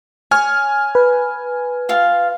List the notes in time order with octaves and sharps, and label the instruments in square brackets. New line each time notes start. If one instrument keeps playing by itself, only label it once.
[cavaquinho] C#5 [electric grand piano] G#5 F6
[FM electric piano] B4
[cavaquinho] F4 F5